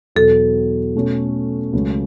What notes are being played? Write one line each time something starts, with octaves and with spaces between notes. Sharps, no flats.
E2 B2 F#3 A4
B2 A3 C#4
C#2 C#3 F#3 A3 C#4